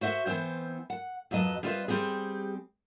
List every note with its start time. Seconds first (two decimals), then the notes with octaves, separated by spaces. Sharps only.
0.01 F#4 C5 E5 F#5
0.26 E3 B3 C4 C5
0.90 F#5
1.31 F2 F#3 B4 D#5 A5
1.63 G3 C4 F4 B4 D#5 E5
1.88 G3 C4 G4 G#4